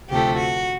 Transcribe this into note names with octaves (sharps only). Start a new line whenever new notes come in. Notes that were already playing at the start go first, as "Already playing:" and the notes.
D2 C3 F3 A3 G4
F#4